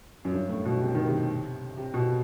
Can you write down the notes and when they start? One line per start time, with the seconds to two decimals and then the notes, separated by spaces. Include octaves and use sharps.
0.25 F#2
0.33 G2
0.49 A2
0.65 B2
0.81 C3
0.95 D#3
1.07 C3
1.77 C3
1.94 B2